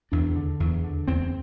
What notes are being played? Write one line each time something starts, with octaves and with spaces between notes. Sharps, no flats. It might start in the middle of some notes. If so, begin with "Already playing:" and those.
E2 D4
D3
E2
D3
E2 C4